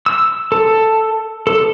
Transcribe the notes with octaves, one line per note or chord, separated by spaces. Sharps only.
E6
A4
A4